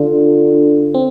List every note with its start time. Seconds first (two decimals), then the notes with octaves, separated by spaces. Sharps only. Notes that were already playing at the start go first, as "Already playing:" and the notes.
Already playing: D3 D4 F4
0.94 C4